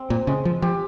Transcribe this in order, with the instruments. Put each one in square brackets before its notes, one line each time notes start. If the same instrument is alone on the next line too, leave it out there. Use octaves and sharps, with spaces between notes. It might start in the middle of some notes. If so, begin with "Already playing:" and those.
Already playing: [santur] G#3 C4 C5
[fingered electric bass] A#2
[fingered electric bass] C#3 [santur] G#3
[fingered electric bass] F3
[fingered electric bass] F3 [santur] G4